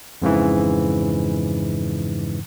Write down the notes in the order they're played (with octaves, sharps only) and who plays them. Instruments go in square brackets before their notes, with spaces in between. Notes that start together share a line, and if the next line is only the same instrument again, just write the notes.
[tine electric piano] F2 G#2 C#3 E3